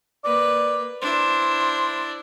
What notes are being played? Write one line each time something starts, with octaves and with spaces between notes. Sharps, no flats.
A#3 B4 D5
D4 E4 C5